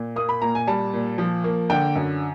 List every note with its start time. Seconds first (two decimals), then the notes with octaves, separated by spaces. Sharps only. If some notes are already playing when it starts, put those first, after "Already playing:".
Already playing: A#2
0.16 A#3 D#6
0.29 B5
0.41 A#2 A#5
0.55 G#5
0.67 G3 A5
0.93 A#2
1.18 F3
1.44 A#3
1.70 D3 G5
1.95 F#2